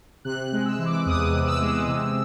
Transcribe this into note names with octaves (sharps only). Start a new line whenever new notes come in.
C3 F#6
G#3
E6
E3
D6
E2 D#6
C3
E6
G#3
C3